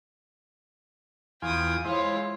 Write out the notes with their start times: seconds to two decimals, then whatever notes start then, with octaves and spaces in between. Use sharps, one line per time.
1.42 E2 F4 G5 G#5 D#6
1.85 G#3 E4 F4 C5 C#5